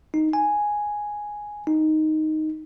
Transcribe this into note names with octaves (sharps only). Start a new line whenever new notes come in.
D#4
G#5
D#4